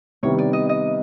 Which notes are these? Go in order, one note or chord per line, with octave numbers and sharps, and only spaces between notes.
C3 D#3 G3 B3 E4 C#5
D5
D#5
D#5